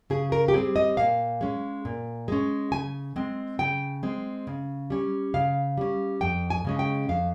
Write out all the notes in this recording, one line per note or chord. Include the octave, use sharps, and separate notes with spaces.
C#3 G#4
A#4
G4
G3 C4 G#4
D#5
A#2 F5
G#3 C#4
A#2
G#3 C#4
C#3 G#5
G#3 C4
C#3 G5
G#3 C4
C#3
G3 C#4
C#3 F5
G3 C#4
F2 G5
G#5
C#3 G#3 C#4
G5
F2 F5